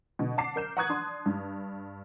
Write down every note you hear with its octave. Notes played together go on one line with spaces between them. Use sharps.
B2 D3
F#5 A5 D6 C7
A#4 G6 E7
F#5 A#5 C#6 D#6 F#6 G#6
D4 C6
G2